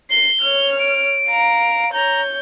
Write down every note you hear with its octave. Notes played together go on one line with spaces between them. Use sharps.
C7 G7
C#5 F6
D7
F5 A#5
C#5 A#5 G6